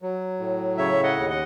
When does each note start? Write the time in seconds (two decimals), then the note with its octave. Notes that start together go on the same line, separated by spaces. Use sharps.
0.02 F#3
0.39 A2
0.78 C#3 C#5 E5
1.03 D#5 F#5
1.16 D#2
1.30 D#5 F#5